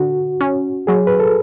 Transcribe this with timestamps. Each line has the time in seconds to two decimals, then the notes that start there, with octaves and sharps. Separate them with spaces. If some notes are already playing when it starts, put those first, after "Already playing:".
Already playing: D3 F#4
0.41 C#4
0.87 F#3 G#4
1.07 B4
1.20 A4